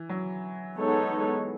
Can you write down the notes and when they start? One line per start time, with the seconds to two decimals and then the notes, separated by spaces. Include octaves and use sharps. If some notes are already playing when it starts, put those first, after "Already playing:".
Already playing: E3
0.09 F#3
0.78 G#3 B3 D#4 A4 C#5